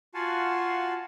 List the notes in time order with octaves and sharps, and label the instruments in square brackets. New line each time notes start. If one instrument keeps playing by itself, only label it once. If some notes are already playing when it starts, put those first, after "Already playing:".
[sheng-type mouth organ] F4 F#4 F5 F#5 G#5 A5